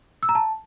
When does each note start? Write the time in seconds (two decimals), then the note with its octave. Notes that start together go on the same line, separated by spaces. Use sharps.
0.23 E6
0.29 A#5
0.35 A5